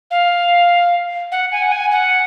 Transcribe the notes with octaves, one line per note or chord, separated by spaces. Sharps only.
F5
F#5
G#5
F#5
G#5
F#5